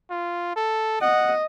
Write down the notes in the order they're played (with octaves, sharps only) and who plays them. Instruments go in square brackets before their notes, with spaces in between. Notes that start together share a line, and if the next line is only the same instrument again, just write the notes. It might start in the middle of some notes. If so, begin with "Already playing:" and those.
[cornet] F4
A4
[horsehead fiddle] D#5 [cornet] F#5